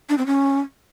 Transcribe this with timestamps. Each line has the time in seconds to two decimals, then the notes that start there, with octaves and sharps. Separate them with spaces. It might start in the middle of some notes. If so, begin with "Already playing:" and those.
0.09 D4
0.18 C4
0.26 C#4